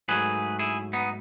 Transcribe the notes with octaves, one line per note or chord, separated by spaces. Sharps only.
G#2 F#3 A3 G#4 B4
E4 G#4
B3 D#4